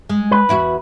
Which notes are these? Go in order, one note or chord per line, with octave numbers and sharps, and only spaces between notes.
G#3
B4
E2 E4 F#4